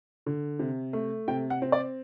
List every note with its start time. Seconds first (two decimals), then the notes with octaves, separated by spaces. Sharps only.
0.26 D3
0.59 C3
0.93 A3
1.28 C3 G5
1.50 F#5
1.62 C4
1.72 D5